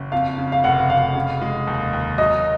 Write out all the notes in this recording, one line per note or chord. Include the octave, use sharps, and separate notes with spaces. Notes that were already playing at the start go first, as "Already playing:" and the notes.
Already playing: F#1
F2 F5
C#3
F5
F1 F#5
F1 F5
C#3
G#3
D#2
D#2
F#3 D#5